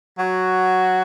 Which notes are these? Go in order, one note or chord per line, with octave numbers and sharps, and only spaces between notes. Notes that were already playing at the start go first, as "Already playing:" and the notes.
F#3 F#4